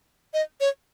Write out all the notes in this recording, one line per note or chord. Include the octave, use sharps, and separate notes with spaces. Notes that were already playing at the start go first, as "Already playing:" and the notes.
D#5
C#5